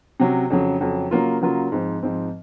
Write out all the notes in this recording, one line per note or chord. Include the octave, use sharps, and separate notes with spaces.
C3 F#3 C#4
F2 C#3 F#3
F2 C#3 F#3
C#3 F#3 A#3 F4
C#3 F#3 A#3 F4
G#2 F3 C4
G#2 F3 C4